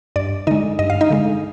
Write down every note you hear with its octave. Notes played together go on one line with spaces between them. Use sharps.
G2 D5
D3 G#3 D#4 D#5
G2 D#5
F5
D#4 D#5
D3 G#3